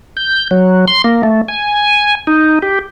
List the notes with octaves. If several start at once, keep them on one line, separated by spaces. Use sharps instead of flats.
G6
F#3
C6
A#3
A3
G#5
D#4
G4